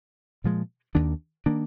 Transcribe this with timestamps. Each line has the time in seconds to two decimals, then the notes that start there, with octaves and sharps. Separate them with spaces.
0.44 A#2 F3 G#3
0.95 D#2 D#3 A#3 D4
1.46 D#3 A#3 D4